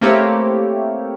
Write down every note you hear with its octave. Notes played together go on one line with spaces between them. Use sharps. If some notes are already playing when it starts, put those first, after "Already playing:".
A3 A#3 C4 E4 G4 C#5